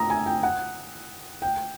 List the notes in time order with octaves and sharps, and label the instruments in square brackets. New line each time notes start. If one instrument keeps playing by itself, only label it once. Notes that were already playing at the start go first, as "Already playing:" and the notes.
Already playing: [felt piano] A#5 D#6 E6
G#5
G5
F#5
G5